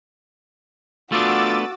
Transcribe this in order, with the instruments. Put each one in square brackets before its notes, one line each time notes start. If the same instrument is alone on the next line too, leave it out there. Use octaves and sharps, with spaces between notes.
[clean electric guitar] A3 B3 D4 [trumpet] F4 [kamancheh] F#4 [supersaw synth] D6 E6 A6